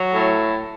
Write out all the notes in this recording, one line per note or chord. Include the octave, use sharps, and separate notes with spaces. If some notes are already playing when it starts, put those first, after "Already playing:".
Already playing: F#3
A2